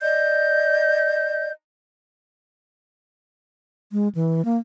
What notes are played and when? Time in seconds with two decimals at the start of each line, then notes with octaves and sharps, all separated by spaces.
0.01 D5 D#5 G6
3.92 G#3
4.15 E3
4.45 A#3